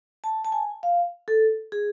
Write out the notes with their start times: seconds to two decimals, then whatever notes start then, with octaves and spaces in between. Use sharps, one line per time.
0.24 A5
0.45 A5
0.52 G#5
0.83 F5
1.28 A4
1.72 G#4